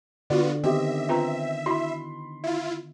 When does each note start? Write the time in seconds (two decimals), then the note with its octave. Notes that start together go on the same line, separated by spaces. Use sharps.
0.30 D3 B3 F4 F#4 D5
0.64 D#3 B3 C4 G4 D#5 E5
1.09 C4 F4 B4 A#5
1.66 E4 F#4 B5 C6
2.44 E4 F4 E5